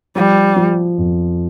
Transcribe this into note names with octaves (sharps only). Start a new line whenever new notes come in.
F3 G3
F3
F2